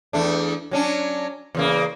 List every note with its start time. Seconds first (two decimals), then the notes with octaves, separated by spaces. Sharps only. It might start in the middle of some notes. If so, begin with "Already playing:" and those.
0.13 E2 A3 D4
0.71 F#3 C#4 D4
1.55 E2 C#3 A#3